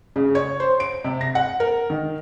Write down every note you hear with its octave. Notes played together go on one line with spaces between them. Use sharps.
C#3
C#5
C5
D7
C3
A#6
F#5
A#4
D#3